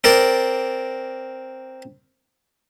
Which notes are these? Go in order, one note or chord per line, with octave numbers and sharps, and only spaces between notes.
C4 A#4 D5